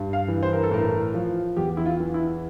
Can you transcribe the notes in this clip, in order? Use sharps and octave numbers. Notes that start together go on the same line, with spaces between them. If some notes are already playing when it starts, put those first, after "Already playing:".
Already playing: G2
F5
E3
C5
A#4
A4
A2 A#4
F3
E2 G4
E4
F4
E3
E4